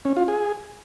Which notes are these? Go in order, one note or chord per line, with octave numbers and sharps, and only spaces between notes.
C#4
F4
G#4